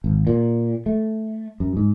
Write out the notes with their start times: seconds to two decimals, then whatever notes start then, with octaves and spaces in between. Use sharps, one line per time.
0.04 G#1
0.27 A#2
0.86 A3
1.60 F#2
1.77 G#2